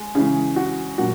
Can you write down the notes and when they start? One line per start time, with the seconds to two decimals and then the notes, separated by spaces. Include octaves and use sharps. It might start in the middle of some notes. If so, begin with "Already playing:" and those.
Already playing: G#3
0.15 C#3 E3 G#3 G#4
0.56 F#4
0.98 A#2 F#3 F#4